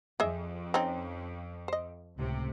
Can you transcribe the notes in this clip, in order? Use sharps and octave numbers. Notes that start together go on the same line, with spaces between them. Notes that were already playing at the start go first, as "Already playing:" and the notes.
F2 G#4 D#5 E5
C4 C#4 D#4
C5 D#5
C#2 A2 C3